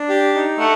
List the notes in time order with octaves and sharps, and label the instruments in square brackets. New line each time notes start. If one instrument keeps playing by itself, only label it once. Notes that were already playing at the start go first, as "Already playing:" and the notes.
Already playing: [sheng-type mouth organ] D4
G4
D#4
[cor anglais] A3 [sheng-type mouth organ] F#5